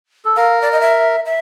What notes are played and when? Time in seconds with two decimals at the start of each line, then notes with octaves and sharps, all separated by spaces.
0.25 A4
0.36 A#4 F5
0.62 D5
0.72 D#5
0.81 E5
1.25 E5